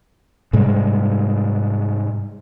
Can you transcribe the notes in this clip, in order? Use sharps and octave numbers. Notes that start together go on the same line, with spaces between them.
G#2 C3 G3 G#3